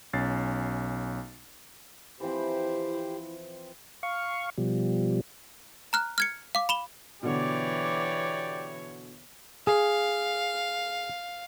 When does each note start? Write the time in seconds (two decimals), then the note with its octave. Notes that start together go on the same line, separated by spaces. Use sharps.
0.13 B1 C#4 A6 C7
2.20 E3 F3 C4 E4 G4 C5
4.03 F5 C#6
4.58 B2 F3 G3
5.93 A#5 F6 F#6
6.18 F6 G#6 C#7
6.55 F5 D6
6.69 B5 E7 G7
7.23 B2 D3 E3 G4 C#5 D5
9.67 G#4 F5